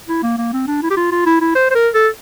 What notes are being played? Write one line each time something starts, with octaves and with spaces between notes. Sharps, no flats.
E4
A#3
A#3
C4
D4
E4
G4
F4
F4
E4
E4
C5
C5
A#4
A4